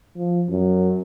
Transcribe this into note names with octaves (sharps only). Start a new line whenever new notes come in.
F3
F#2